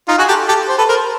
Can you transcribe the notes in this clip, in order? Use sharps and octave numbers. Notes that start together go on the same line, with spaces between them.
D#4 F4
F#4 G#4
G4 A4
G4 A4
C5
A4 B4
A#4 C5